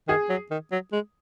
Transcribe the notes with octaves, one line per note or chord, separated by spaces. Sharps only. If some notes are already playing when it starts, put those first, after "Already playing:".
D#3 G#4
F#3
D#3
F#3
G#3